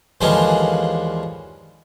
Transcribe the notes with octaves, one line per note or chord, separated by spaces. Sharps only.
D#2 D3 E3 F3 G#3 C#4